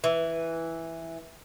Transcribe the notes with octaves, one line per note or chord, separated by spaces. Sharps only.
E3